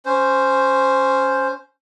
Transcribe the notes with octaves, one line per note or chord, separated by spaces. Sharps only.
C#4 C5